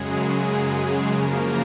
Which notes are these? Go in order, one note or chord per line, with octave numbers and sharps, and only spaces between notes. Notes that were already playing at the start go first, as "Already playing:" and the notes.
Already playing: F#2 C#3 F#3 G#3 G#4
F#2 C#3 F3 A#3 A#4